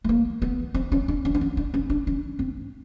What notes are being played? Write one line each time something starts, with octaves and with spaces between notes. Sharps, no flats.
A3
A#3
B3
C4
C#4
D4
C#4
D4
C#4
D4
C#4
D4
C#4
C4